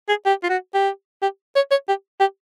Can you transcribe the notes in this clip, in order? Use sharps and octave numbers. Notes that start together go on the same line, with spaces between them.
G#4
G4
F4
F#4
G4
G4
C#5
C#5
G4
G4